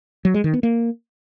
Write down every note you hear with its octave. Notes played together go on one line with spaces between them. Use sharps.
F#3
G#3
D#3
B3
A#3